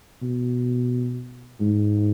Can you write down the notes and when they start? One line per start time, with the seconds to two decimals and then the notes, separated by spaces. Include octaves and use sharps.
0.22 B2
1.61 G#2